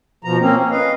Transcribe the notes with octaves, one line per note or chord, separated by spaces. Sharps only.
B2 F3 A#5
A#3 C4 C#4
C#4
B4 D#5 F5